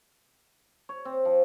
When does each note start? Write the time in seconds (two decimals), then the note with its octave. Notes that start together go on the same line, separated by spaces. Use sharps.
0.89 C#5
1.05 C4
1.25 F3